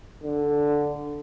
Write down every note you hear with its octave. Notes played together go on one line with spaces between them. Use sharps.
D3